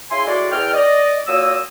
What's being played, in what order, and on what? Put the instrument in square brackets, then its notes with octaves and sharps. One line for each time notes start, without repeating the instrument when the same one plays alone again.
[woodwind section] C#3 E4 G#5 C6
A2 G#3 F#4 D5
E2 G5 F6
D5 D#5
A#2 F#3 A#3 D#6 E6